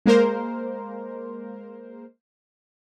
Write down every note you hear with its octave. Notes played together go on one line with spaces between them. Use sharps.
G#3 A#3 A#4 C5